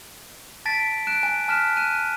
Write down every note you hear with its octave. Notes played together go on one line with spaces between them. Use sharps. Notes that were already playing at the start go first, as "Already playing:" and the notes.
A5 A6 B6 D7
F#6 D7 E7
G#5
A5 F6 F#6 B6 E7
F#6 D#7 E7